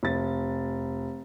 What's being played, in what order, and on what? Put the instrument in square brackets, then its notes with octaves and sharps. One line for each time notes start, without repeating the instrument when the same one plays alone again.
[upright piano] F1 A6